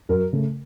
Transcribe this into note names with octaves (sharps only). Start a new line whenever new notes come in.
F#2 A#4
C#3 A3